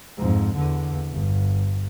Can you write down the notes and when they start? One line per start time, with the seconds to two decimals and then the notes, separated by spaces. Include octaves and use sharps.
0.17 F2 G#2
0.57 E2 D3
1.12 G1